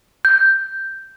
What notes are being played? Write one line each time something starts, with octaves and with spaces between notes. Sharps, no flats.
G6